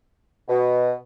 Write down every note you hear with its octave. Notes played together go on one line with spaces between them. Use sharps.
B2